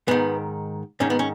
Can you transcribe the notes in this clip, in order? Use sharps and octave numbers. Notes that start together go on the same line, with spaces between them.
G#2 D#3 B3
G#2 D#3 C#4
B3
C#4